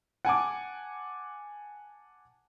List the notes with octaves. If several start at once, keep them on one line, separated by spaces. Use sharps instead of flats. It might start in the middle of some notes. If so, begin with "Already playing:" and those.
F#5 G#5 A5 D6